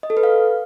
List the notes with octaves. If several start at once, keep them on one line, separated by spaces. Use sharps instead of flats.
D#5
A4
B4
F5